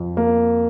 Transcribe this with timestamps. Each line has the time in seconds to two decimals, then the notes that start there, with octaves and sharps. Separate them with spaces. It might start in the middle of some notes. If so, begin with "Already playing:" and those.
Already playing: F2
0.17 A#3